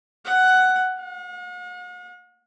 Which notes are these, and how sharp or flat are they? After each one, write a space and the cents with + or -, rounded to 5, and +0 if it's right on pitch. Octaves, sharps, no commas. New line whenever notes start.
F#5 +10
F#5 -45